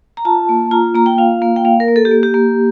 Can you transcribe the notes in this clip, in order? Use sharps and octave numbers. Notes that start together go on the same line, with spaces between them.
A#5
F4 A5
A#3
F4 A#5
A#3 A#5
G5
F4 F5
A#3
G5
A#3 F5
A#4
A#3
A4
G4
A#3
G4
A#3